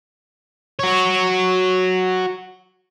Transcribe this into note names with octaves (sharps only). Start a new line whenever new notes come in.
F#4 C#5